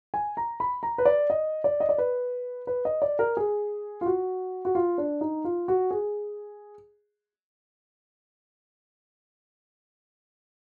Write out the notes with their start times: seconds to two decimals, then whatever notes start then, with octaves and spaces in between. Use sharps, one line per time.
0.14 G#5
0.37 A#5
0.60 B5
0.83 A#5
0.98 B4
1.05 D5
1.30 D#5
1.64 D5
1.80 D#5
1.89 D5
1.98 B4
2.67 B4
2.85 D#5
3.02 D5
3.19 A#4
3.37 G#4
4.01 F4
4.06 F#4
4.65 F#4
4.75 F4
4.98 D4
5.21 D#4
5.45 F4
5.68 F#4
5.91 G#4